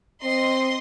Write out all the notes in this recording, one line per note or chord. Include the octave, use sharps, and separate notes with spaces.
C4 D#5 C6